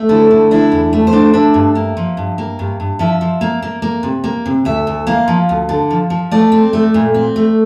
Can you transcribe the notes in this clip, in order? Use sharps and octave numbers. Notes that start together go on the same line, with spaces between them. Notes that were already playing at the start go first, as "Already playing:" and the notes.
Already playing: A3
D3 E4
D3
D4 E4
E2
A3
C5
D4
D4 E5
G2
A#3
F3
G2
A#3
G2
G2
F3 E5
F3
A#3
A#3
A#3
C3
A#3
C3
D2 E5
D2
A#3 F5
F3
D2
D3
F3
F3
A3 D5
C4
A3
A#2
C4
A3